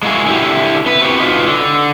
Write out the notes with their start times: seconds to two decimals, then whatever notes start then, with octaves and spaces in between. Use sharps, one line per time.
0.03 G#3 A#3 E4 F#4 G#4
0.26 D3 E4 F#4 G4
0.86 B3 B4
1.01 C4 F#4 G4
1.19 D#4 F4 B4
1.47 D3